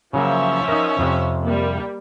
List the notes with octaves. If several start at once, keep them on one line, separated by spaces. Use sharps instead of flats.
C#3 F3 F#3 A#3 C#4 E5
D#4 A#4
F2 C3
G3 A#3